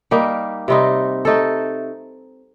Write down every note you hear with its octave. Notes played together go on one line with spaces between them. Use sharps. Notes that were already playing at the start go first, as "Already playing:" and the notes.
G3 A#3 D#4 G4
C3 G3 C4 D#4
A3 D#4 A4